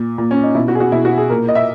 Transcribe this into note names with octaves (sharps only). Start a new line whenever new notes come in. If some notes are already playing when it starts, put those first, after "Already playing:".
Already playing: A#2
A#2
C#4
D#4
B2 E4
F#4
G#4
F#4
B2 E4
F#4
G#4
A#2 A#4
D#5
E5